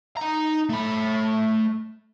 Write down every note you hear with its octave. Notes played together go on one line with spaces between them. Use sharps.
D#4 A#5
A3 B5